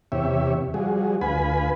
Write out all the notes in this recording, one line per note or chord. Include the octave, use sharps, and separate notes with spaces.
E2 C3 G4 C#5 E5
F3 G3 F#4 G#4
D2 F4 B4 G#5 B5